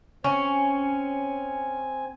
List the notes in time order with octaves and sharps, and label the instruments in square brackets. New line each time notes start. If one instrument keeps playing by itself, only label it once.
[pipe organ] C4 G#5 [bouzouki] C#4